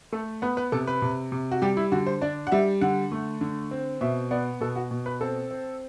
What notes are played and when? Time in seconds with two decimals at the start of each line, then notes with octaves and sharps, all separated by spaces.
0.12 A3 A4
0.42 B3 B4
0.57 B4
0.72 C3 A4
0.87 B4
1.02 C3
1.32 C3
1.51 F#4
1.62 G3 G4
1.77 E4
1.92 D3 F#4
2.06 C5
2.21 D4 D5
2.47 F#5
2.52 G3 E5
2.81 D3 F#5
3.12 A3
3.41 D3
3.71 C4
4.01 B2 E5
4.31 B3 D5
4.61 B2 A4
4.76 F#4
4.91 B2
5.06 B4
5.21 C4 A4
5.51 C4